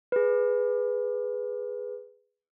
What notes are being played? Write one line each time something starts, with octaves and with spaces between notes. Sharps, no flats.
G#4 B4